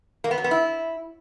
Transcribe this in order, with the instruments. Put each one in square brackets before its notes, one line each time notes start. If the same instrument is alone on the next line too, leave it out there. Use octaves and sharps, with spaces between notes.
[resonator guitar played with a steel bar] A#3
B3
F#3
B3
E4